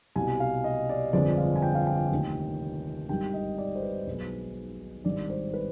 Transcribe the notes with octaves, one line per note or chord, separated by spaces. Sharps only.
C2 B2 G3 G#5
F5
D#5
D5
G1 F2 D3 F3 G#3 D5
F5
G#5
G5
F5
G5
F1 D#2 D#3
G#1 G2 D#3 G3 G5
D#5
D5
C5
B4
B1 B2 G#3
G#1 G2 D#3 D5
C5
B4